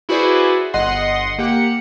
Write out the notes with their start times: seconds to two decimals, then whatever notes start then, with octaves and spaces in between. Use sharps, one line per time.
0.09 E4 F#4 G#4 B4 C5 D5
0.73 G1 D#5 F#5 C6 C7
1.38 A#3 G4 F#5 C#7